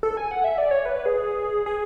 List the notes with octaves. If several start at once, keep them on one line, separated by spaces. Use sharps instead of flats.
A4
G#5
F#5
E5
D5
C#5
B4
G#4
G#4